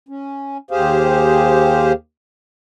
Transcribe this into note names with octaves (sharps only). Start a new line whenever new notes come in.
C#4
D#2 G4 G#4 C5 F5